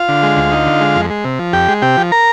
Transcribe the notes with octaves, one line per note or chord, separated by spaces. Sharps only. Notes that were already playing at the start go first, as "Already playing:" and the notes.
Already playing: F4 F5
D3
G#3
D2
D#4
D3
G#3
F2
G#3
C3
F3
F2 G4 G5
G#3
C3 G4 G5
F3
A#4 A#5